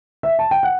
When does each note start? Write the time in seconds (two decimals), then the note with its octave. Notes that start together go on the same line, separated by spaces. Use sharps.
0.23 E5
0.39 A5
0.51 G5
0.63 F#5